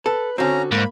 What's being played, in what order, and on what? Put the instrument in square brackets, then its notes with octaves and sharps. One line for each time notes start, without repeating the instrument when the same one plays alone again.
[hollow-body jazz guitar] A4 [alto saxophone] B4
[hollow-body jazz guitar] D3 C4 [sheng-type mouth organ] C#4 A#5 [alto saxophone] F#4
[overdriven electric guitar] G#2 [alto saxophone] A#3 [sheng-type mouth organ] B5